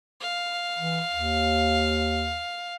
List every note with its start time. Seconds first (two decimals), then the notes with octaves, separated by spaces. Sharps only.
0.21 F5
0.78 E3
1.12 D#2